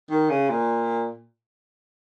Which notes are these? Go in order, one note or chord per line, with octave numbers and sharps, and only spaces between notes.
D#3
C#3
A#2